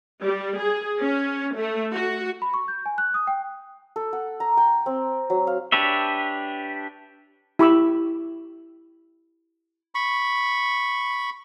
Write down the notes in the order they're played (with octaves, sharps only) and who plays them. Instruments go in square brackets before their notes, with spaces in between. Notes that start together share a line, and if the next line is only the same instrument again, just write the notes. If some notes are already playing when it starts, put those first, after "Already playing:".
[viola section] G3
G#4
C#4
A3
F#4
[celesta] B5
C#6
G6
G#5
F#6
D#6
G5
[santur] A4
F#5
A#5
G5
C4
F#3
F5
[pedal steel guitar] D4 G4 B4 C#5 E5
[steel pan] E4 G4 B5 C#6 D6 E6
[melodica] B5 C#6